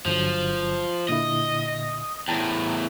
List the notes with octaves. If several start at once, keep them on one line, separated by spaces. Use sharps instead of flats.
G1 D3 F3 F#3
A#2 D3 E4 D#5
E2 A2 G5 A5 A#5